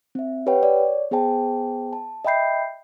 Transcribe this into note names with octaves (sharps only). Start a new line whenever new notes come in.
C4 E5
G4 B4 C#5 F#5 G5
C#5 D5
B3 G#4 C5 G5 A5
A5
D#5 E5 G5 B5 G6 C7